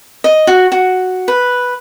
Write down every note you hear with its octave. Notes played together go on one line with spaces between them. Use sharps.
D#5
F#4
F#4
B4